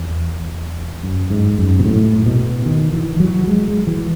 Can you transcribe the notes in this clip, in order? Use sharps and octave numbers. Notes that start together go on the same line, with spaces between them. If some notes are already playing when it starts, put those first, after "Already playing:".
Already playing: E2
F#2
G#2
F#2
B2
A2
B2
D#3
E3
F#3
G#3
G#3
E3